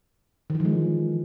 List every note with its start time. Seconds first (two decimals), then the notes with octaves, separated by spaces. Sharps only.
0.50 D#3
0.55 E3
0.60 F3
0.65 G#3